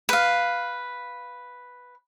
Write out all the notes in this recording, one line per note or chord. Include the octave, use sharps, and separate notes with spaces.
B4 F5